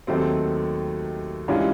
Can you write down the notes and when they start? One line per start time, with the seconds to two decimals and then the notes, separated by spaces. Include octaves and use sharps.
0.07 D#2 D#3 F#3 A3 C4
1.48 G2 E3 G#3 C#4 F4